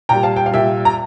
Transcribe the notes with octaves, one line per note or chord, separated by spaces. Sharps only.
A#2 G3 G5 A#5
F5 A5
G5
F5
A#2 G3 E5 G5
A#5